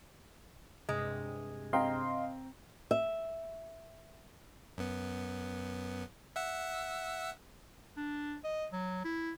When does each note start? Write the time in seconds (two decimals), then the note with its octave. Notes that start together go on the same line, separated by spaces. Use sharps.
0.89 G2 C3 G#3
1.73 C4 D#5 F5 G5 A#5 C6
2.91 E5
4.78 F#2 B3
6.36 E5 F#5 E6
7.97 D4
8.44 D#5
8.73 F#3
9.05 E4